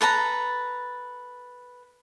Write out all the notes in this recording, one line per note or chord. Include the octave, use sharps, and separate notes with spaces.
A4 B4 A5 A#5